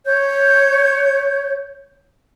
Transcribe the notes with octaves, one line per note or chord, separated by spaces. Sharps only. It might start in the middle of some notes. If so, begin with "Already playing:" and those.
C#5 G6